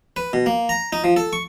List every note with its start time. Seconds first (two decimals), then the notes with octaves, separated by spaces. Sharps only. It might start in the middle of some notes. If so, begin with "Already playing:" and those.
0.16 B4
0.33 B2
0.46 A#3
0.69 A#5
0.92 D#4
1.04 F3
1.16 A4
1.33 C#6